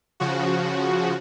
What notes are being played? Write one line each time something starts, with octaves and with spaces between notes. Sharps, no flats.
C#3 F3 F#4